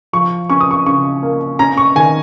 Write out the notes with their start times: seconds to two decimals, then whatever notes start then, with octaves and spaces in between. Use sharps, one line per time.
0.13 F3 C#6
0.50 C#4 C#6
0.61 D#6
0.71 C#6
0.86 C#3 C#6
1.23 A#3
1.59 C#4 A#5
1.78 C#6
1.95 D#3 G#5